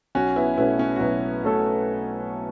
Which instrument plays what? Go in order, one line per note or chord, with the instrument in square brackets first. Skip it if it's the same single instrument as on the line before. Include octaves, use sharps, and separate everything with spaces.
[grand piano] B1 [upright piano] C#4 F#4
[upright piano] B3 E4
[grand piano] B2 A3 C#4 A4 [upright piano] B3 E4
[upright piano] C#4
F#4
[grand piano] B1 [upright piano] B3 E4
[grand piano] B2 A3 C#4 A4